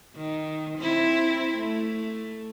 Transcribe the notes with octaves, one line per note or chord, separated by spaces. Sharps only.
D#3
C4 E4
A3